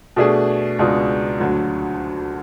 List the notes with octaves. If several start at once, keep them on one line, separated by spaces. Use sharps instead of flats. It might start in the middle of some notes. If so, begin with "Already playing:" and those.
B2 A3 D4 G#4
C#2 B2 G#3 D4
D2 D3 F#3